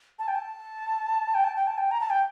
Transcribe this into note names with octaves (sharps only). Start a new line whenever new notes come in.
A5
G5
A5
G5
A5
G5
A5
G5
A#5
A5
G5